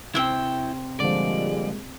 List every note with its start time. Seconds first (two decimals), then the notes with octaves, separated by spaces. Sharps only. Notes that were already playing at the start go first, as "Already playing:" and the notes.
0.15 C3 C4 E4 G5
1.00 A#2 D3 F3 G3 G#3 D5